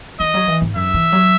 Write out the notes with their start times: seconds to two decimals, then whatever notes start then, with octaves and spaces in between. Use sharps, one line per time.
0.20 E3 D#5
0.34 F#3
0.47 E3
0.62 G#2
0.75 F#2 E5
0.94 E3
1.12 F#3